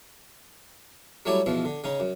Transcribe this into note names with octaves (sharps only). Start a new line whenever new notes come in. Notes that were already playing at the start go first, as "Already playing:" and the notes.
F#3 G3 A3 E4 C#5 D5
E2 B2 F3 E5
D3
C#3 C#4 D#4
F#2